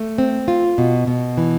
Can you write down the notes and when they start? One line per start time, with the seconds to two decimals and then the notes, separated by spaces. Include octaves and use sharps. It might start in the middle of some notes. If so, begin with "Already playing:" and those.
Already playing: A3
0.18 C4
0.48 F4
0.78 B2
1.07 B2
1.38 E3